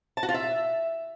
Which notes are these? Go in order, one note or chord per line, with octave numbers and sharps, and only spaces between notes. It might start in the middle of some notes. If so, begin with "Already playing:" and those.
A5
F#4
F4
E5